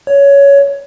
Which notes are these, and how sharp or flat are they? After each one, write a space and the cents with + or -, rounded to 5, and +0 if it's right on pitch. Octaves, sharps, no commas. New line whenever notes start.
C#5 +15